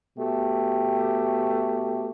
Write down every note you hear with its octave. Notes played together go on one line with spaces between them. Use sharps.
B2 A3 G4